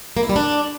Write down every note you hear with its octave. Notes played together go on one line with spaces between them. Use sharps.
A#3
E4
G3
D4